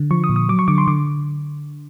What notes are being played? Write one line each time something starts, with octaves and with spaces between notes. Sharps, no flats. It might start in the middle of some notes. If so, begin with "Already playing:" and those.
Already playing: D3
F3 C#6
D#6
A#2
D#6
F#3 D6
C#6
D3 D6
C6
D3 D6